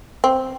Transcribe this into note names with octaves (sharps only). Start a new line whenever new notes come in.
C4